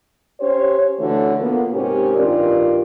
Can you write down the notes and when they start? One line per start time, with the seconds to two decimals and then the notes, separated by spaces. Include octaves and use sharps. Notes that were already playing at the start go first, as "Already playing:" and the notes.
0.41 C#4 G4 C5 C#5
0.99 D3 E3 A3 F#4 C#5
1.41 A#2 A#3 B3
1.73 G#2 C3 C#4 G4 A#4
2.16 G2 D#3 F4 G4 D5